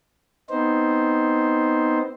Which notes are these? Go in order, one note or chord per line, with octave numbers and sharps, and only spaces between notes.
B3 C4 D#4 C5